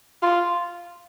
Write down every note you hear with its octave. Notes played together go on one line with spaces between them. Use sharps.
F4